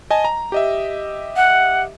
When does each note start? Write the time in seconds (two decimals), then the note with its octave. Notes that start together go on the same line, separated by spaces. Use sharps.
0.11 D#5 G#5 A5
0.25 A#5
0.52 G4 D#5 E5
1.36 F#5